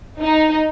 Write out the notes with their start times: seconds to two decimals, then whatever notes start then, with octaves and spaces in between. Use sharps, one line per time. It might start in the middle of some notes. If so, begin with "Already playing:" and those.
0.20 D#4